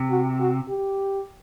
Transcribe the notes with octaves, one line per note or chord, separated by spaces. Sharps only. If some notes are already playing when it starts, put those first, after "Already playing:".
Already playing: C3
F#4
F#4
G4